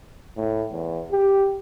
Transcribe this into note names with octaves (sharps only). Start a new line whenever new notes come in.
A2
E2
G4